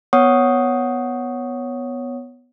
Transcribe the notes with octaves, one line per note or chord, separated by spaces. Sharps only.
B3 C#5 F#5 C#6 D#6